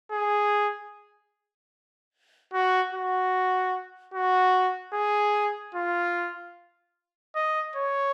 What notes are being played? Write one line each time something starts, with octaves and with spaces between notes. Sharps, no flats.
G#4
F#4
F#4
F#4
G#4
F4
D#5
C#5